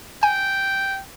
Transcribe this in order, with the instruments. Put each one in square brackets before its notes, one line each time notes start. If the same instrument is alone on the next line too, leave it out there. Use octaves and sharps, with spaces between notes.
[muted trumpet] G5 [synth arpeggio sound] G#5